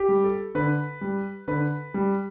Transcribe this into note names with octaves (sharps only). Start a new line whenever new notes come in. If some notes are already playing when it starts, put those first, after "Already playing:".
Already playing: G4
G3
A4
D3 B4
G3
D3 B4
G3